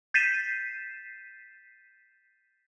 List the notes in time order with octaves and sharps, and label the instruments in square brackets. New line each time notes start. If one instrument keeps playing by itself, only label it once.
[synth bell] G6 A6 B6 C7 D#7 E7